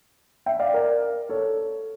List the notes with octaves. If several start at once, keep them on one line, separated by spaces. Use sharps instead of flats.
E5 G5
D5 F5
A#4 D5
A4 C#5